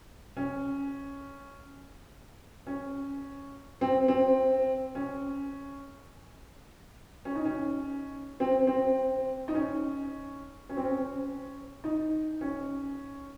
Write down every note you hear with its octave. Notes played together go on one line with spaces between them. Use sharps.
C#4
C#4
C4
C4
C#4
C#4
D#4
C#4
C4
C4
D#4
C#4
C#4
C4
C#4
D#4
C#4